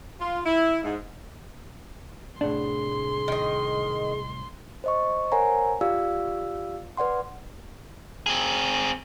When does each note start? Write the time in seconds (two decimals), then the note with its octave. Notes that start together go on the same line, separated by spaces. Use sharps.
0.20 F4
0.46 E4
0.83 G#2
2.41 C2 A2 D4 G#4 C6
3.28 D#3 D#5
4.84 C5 D#5 C#6
5.32 A#4 C5 C#5 F#5 G#5 A#5
5.81 F4 G4 D5 F5 E6
6.97 B4 D5 F#5 C6
8.26 C4 G#4